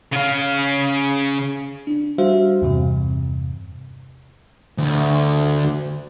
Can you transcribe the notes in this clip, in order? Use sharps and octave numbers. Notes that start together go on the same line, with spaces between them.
C#3 F5
D4
G3 D4 F#4 C5 E5 F5
E2 G2 C3
D2